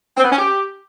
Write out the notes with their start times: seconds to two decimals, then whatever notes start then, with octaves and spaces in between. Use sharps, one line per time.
0.17 C4
0.24 B3
0.31 C#4
0.38 G4